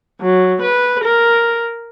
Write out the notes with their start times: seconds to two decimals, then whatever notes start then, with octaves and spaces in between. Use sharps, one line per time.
0.21 F#3
0.61 B4
1.03 A#4